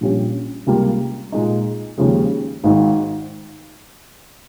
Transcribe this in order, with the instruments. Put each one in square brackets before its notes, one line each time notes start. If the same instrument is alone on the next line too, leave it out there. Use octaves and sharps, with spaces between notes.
[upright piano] A#1 A#2 G3 C#4 G4
C#2 C3 G3 A#3 F4
A#2 G#3 D#4
D#2 C#3 F3 G#3
G#1 G#2 D#3